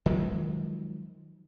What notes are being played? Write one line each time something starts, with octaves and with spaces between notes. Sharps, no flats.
D#3 F3 F#3 G#3